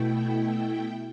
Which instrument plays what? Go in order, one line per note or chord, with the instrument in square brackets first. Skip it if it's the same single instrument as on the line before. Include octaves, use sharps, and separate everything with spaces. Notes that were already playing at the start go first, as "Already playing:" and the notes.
Already playing: [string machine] B2 A3 E4 G5